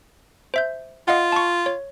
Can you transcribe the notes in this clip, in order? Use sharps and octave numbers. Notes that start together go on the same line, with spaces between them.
C5 E5 G6
F4 D#5 F5 F#5
A5 C#6
C#5